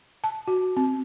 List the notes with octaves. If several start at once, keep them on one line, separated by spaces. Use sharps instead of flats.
A5
F#4
C4